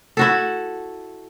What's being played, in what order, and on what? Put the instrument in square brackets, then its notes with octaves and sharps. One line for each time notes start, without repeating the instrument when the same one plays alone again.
[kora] E4 F#4 A4